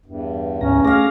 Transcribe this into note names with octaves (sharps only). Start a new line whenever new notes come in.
E2 G2
D2 G#2 C#4 A#5
A3 G#4 F5 D6 A#6